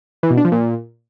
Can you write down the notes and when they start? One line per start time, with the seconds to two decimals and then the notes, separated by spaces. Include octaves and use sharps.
0.23 E3
0.30 B2
0.37 D4
0.45 F3
0.52 A#2